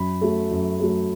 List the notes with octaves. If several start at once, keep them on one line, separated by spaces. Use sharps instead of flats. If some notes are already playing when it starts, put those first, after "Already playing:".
Already playing: F#2 B5
F#3 A3
F#2
F#3 A3